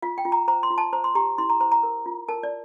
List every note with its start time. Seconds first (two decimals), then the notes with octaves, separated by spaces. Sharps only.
0.02 F4 F5
0.18 G5
0.25 F4
0.32 A#5
0.48 C5 A#5
0.63 C6
0.70 F4
0.78 A5
0.93 C5 A#5
1.04 C6
1.15 G4 A#5
1.38 E4 C6
1.50 A#5
1.61 C5 A#5
1.72 A#5
1.83 A#4
2.06 F4
2.28 A#4 A5
2.43 D5